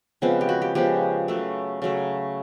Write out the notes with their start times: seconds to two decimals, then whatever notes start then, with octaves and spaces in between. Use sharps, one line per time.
0.22 C#3 F3 G#3 B3 C4
0.41 G4
0.49 F#4
0.62 G4
0.75 C#3 F3 G#3 B3 G4
1.28 C#3 F#3 A3
1.82 C#3 F#3 A3